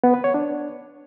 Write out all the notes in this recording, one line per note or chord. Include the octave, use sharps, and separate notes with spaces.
B3
B4
C#5
D4